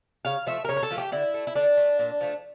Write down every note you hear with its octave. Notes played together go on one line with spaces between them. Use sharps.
C#3 F5
F3 A3 E5
A#4
C#3 C#5
A#4
A4
F3 A3
G4
D3 E4
A3
E4
D3 D4
A3
A#2
F3 A3